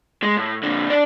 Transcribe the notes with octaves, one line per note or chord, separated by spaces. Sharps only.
G#3
A2
A#2 D3
D4 D5